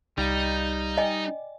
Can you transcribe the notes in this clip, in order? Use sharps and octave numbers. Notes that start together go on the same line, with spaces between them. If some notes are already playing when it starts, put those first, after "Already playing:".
C2 G3 D#4 F5 G5
D5 D#5 G5 G#5